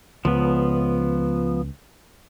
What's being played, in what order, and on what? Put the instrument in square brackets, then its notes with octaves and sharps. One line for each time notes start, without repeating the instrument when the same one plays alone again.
[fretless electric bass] C#2 [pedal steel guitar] F3 B3